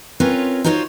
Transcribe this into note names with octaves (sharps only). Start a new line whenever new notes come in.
C4 C#4 F4 A#4 B4 C#5
D#4 F4 F#4 A#4 C5 C#5